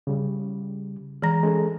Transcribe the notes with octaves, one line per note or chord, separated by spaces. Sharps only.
C#3 G3
E3 G#3 A#5 A#6
G#3 C#4 A4